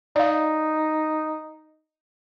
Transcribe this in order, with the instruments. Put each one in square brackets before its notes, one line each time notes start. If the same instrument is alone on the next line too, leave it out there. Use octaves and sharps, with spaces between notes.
[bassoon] D#4 [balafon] D5 F5